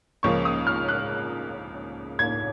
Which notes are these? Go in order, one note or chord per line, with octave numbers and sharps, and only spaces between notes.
C#2 C#3 F3 A#3 F4 C#6
D#6
F6
F#6
G#6